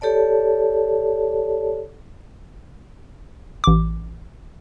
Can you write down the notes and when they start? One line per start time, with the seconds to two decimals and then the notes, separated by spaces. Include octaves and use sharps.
0.01 G4 A4 C#5 D5 A5
3.64 A1 D6